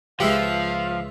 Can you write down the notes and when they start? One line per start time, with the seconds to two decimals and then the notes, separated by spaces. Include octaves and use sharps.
0.20 C#2 F3 G#3 G4 B4 E5 F5